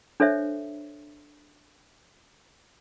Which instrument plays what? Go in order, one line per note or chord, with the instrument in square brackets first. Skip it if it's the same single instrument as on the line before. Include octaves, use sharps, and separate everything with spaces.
[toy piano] D4 A4 C5 C#5 E5